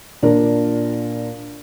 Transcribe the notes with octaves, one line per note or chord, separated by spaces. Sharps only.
A#2 D4 F4 A#4